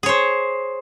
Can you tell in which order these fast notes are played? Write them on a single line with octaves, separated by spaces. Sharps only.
G#4 C#5 C5